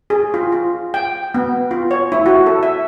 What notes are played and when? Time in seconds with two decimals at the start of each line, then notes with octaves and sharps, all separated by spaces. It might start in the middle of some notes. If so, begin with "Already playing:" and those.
0.10 G#4
0.34 F4
0.52 F4
0.94 G5
1.35 B3
1.71 F4
1.91 C#5
2.12 E4
2.26 F#4
2.46 A4
2.63 E5